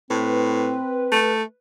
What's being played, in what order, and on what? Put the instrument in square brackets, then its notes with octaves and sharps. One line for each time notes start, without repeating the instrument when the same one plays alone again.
[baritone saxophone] A2 [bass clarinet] C4 [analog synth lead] B4
[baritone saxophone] A3